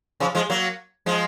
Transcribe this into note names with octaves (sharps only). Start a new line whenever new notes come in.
C#3 F3
F3 G#3
F#3 A#3
F3 G#3